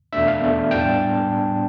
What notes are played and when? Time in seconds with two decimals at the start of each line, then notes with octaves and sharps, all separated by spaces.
0.13 E2 B2 A3 D4 E5
0.28 F5
0.41 E2 B2 A3 D4
0.71 A2 G3 B3 D4 G5
0.81 A5